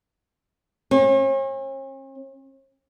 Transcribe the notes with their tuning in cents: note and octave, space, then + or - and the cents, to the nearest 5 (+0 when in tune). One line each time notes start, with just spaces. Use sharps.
C#4 -45